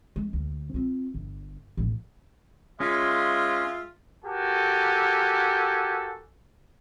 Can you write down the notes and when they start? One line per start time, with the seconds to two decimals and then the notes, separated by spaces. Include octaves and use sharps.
0.16 G#3
0.33 D2
0.74 C4 F4
1.14 G1
1.77 E1 A1
2.80 G#3 C#4 F4 E5
4.25 F#4 G4 A4 A#4 G#5